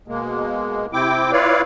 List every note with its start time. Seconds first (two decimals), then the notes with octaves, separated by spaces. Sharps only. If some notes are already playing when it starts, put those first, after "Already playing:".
0.08 B2 G#3 A#3
0.93 C3 C4 E4 G5 D6
1.32 E4 F4 B4 C#5 D5 F5